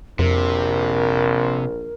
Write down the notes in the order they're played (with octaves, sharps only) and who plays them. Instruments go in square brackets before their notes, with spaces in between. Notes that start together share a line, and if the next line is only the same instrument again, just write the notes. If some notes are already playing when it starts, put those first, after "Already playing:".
[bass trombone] A#1 [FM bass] F2 [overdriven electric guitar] C3 [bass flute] A#4